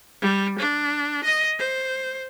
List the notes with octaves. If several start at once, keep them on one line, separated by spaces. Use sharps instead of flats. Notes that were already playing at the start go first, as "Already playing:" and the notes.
G3
D4
D#5
C5